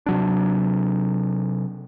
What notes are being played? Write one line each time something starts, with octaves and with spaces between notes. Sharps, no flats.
C3 F#3 D4